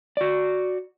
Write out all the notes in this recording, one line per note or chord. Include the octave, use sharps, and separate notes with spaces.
F#4 D5